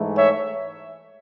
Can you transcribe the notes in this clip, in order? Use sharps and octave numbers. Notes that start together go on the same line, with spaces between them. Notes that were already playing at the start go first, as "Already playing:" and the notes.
Already playing: G#2 E3 A3
C#5 E5